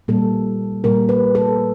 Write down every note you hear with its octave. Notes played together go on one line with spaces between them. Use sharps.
A#2 G3 A#3 A4
A#2 G3 A#3 A#4
B4
A4